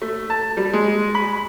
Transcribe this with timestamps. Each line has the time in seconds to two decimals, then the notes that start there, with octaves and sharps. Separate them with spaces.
0.02 A3
0.30 A5
0.57 G3
0.73 G#3
1.15 B5